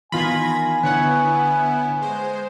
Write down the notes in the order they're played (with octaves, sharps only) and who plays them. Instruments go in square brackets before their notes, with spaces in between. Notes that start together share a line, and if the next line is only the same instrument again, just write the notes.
[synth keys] D#3 F4 B5 [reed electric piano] E3 B3 [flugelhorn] G#5 [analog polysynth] G#6 A#6
[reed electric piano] D3 D4 [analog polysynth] B3 E4 [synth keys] B4 C#5 F#5
[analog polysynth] G#3 C5